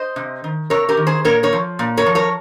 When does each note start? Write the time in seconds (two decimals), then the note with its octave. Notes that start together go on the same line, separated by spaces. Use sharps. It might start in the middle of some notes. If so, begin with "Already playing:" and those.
Already playing: C5 D#5
0.16 C3
0.44 D#3
0.70 C3 A#4 C#5
0.89 G4 A#4
0.97 D#3
1.07 G#4 C5
1.25 A#2 A#4 C#5
1.43 A#4 C#5
1.53 F3
1.79 A#2
1.97 A#4 C#5
2.06 F3
2.15 A#4 C#5